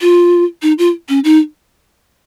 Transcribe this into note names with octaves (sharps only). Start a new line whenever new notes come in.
F4
D#4
F4
C#4
D#4